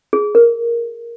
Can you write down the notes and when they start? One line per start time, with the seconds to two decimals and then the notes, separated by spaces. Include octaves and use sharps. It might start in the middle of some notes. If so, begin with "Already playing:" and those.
0.13 G#4
0.35 A#4